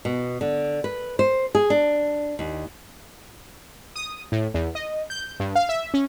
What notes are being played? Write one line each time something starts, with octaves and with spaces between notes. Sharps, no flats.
B2
D3
B4
C5
G#4
D4
D#2
D#6
A2
E2
D#5
G6
G2
F5
E5
C#4